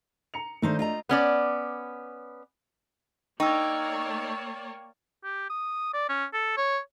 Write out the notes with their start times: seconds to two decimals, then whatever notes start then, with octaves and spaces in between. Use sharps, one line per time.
0.34 A#5 C#7 F7
0.62 D#3 A3 D4 D#4 C5
0.79 F4 D#5 A#5
1.09 B3 C#4 D5
3.40 A#3 D#4 C#5 D5 G5 C#6 E6
5.24 G4
5.50 D#6
5.93 D5
6.09 C#4
6.33 A4
6.57 C#5